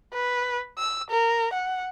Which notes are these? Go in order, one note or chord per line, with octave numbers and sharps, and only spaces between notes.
B4
E6
A#4
F#5